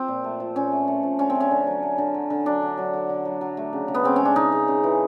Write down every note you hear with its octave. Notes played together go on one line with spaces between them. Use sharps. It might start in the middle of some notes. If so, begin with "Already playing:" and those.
Already playing: F3 C4
A#2
A3
F3
A#2 C#4
A3
A3
F3
D3 C#4
C4
A3
C#4
D3
F#3
A3
D3
F#3
D3
F#3 D4
D3
F#3
D3
D3
F#3
F#3
A3
C#3
C#3
B3
C#3 C4
G#3 C#4
D4
C#3 D#4
G#3
C#3
E3